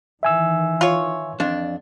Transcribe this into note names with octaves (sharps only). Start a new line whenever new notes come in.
D#3 E3 E5 G#5 E6
F4 C#5
F2 D4